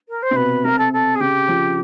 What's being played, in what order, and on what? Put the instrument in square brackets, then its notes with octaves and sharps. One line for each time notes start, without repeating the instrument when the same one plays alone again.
[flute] A#4
C5
[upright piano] C3
[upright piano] B2 [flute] B4
[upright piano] C3 [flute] A#4
[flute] A4
A4
G#4
[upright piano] C#3 [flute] G4
[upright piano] F3